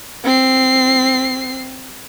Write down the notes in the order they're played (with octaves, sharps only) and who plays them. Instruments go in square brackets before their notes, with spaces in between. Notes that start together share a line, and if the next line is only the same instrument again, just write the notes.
[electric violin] C4 C7